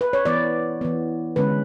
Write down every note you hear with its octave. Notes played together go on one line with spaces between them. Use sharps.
B4
C#5
E3 B3 D5
E3 B3
D3 G#3 C#4 B4